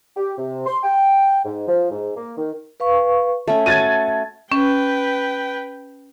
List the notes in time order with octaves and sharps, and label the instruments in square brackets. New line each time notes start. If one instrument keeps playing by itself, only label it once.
[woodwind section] G4
C3
C6
G5
G#2
F3
G#2
A#3
D#3
[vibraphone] B4 F5 C#6
[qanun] A3 C#4 [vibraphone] A5
[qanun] F#4 [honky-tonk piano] G#6 A6 D#7
[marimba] C#4 [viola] B4 G5